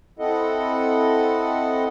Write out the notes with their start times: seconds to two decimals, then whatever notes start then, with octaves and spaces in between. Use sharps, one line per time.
0.19 C4 E4 A4 D#5 F#5